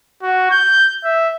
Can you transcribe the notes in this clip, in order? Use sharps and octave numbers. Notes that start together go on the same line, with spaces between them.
F#4
G6
E5